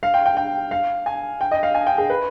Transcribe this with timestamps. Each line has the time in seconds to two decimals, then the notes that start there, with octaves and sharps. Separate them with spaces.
0.03 F5
0.14 G5
0.26 G5
0.37 G5
0.71 F5
1.06 G#5
1.41 G5
1.51 D#5
1.63 F5
1.74 G#5
1.87 G5
1.98 G#4
2.10 B4